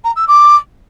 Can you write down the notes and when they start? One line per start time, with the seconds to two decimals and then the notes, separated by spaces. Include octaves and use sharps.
0.04 A#5
0.16 E6
0.28 D6